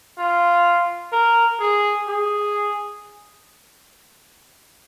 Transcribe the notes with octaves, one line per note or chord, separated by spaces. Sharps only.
F4
A#4
G#4
G#4